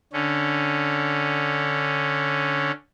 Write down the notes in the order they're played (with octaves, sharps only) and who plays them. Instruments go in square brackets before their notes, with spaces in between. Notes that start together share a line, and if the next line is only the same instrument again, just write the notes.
[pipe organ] D3 C#4